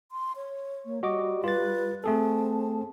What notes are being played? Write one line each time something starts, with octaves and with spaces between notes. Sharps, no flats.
C6
C#5
A#3
G3 F#4 D#5 D6
F4 B4 A6
A3 C4 G#4 A4 A5